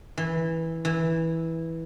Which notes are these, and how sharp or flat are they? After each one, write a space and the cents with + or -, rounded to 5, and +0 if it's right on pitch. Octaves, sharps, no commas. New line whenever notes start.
E3 -10
E3 -10